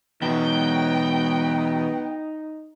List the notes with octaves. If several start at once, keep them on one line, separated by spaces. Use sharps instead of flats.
E2 B2 F#3 B3 D#4 G5